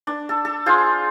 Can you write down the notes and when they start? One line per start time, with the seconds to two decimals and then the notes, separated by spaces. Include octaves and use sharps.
0.07 D4
0.29 A4
0.45 A4
0.66 F4 G#4 C5